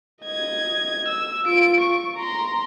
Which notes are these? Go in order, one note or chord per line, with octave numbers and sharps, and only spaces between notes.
D#5 G#6
E6
F4 D7
C#6
A#5 C6